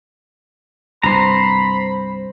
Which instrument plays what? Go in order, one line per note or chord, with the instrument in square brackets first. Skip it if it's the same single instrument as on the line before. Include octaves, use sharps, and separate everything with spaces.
[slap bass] C2 G2 [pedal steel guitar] C5 A#5 [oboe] B5